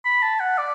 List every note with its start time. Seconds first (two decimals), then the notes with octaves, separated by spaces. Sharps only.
0.05 B5
0.23 A5
0.40 F#5
0.58 D5